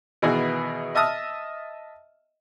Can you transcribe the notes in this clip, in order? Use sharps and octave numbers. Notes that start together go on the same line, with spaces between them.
B2 D#3 E3 B3 E4 G#4
D#5 E5 A5 D#6 F6